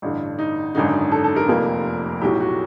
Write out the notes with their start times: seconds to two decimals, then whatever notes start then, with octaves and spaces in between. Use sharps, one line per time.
0.02 A1 G2 D3
0.39 D#4
0.75 G#1 F#2 D3 D#4
1.12 A4
1.24 A4
1.36 A#4
1.48 F1 F2 C3 F3 A#3
2.21 B1 A2 F#3 G4
2.40 F#4